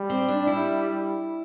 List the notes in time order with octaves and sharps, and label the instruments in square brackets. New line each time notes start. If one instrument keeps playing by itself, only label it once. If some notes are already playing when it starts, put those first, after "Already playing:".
Already playing: [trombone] G3
[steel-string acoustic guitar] C4
D4
E4